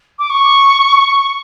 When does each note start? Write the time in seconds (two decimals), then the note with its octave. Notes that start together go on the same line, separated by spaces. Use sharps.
0.19 D6
0.30 C#6